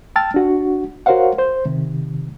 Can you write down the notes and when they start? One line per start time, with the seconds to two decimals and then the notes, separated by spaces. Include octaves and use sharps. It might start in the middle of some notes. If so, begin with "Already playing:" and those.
0.16 G5 A5 E6 F6 A6
0.34 D4 F#4 F#5
1.06 F#4 A#4 C5 C#5 F5 F#5
1.38 C5 G6
1.66 C3 D#3